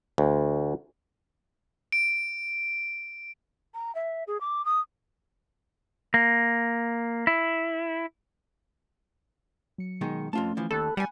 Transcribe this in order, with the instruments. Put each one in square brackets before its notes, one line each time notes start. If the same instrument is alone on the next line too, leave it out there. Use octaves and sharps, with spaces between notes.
[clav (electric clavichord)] D2
[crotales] D7
[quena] A#5
E5
G#4
D6
D#6
[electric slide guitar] A#3
E4
[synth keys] F#3 C#7
[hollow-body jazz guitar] B2 D#3 G#3
[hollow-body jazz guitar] F2 F4 A5 [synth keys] A3 C#4
[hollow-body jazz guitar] E3 F3
[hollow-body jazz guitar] D#2 [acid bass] A4 [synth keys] B5 F#6
[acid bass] G3 [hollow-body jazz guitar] F#5 G#5